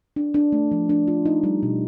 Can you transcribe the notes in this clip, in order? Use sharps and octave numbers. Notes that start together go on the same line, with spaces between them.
D4
D4
A3
F3
D4
F4
D#4
G3
B2